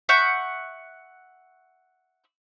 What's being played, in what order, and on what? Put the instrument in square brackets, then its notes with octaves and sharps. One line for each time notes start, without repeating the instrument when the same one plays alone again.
[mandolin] E5 F#5 C#6 G6